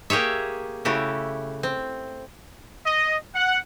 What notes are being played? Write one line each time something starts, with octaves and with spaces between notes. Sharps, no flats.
A#3 G4 G#4 C#5 E5
C#3 A3 E4 F#4 G4
C4
D#5
F#5